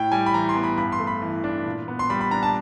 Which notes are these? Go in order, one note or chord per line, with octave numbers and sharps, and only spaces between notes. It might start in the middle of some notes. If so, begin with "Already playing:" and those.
Already playing: A2 G5
G3 G#5
B5
E3 A#5
C6
B3
B5
G2 B5
C6
A3
B5
E3
D4
A#2
B3
C6
G3 B5
B5
D4 A#5
A5